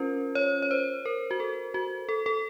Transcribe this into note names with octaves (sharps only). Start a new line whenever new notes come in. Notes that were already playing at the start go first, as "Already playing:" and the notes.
Already playing: C#4 F4 A#4 C5
C#5
C#5
C5
A#4
F#4
A4
F#4
A4
A4